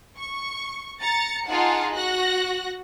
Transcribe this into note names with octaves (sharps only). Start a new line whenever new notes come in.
C#6
A#5 A6 C#7
D#4 F4 G#4 F#5 A5
F#4 F#6 A#6